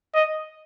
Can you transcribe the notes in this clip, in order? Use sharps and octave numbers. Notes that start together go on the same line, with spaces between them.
D#5